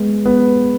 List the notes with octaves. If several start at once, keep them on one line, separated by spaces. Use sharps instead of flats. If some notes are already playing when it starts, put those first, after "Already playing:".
Already playing: G#3 B3
B3